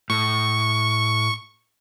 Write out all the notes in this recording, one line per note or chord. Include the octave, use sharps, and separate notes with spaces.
A2 C#6